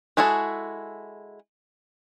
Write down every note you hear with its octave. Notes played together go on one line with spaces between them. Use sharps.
G#3 E4 F#4 G#4 A4